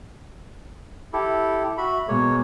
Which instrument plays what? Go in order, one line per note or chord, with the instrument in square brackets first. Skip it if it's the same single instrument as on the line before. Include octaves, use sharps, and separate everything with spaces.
[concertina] E4 G4 A4
F#4 E5 B5
[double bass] B2 G#3 [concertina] A#3 C#5